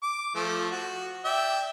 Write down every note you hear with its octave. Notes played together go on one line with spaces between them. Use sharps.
D6
F3 A3
F#4
D5 E5 G5